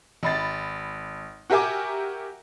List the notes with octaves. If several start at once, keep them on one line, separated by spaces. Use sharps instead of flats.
G#1 B5 A6
F#4 G4 A#4 E5 G#5 D6